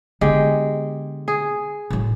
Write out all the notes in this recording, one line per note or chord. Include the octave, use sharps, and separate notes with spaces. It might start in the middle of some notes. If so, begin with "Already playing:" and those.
D3 G#3 B3 G4
G#4
A2 F#3